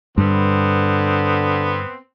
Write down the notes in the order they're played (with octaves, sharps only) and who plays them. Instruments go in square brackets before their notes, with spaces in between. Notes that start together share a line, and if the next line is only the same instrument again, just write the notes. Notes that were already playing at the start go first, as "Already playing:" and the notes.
[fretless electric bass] G2 [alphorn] D3 [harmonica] B3 C4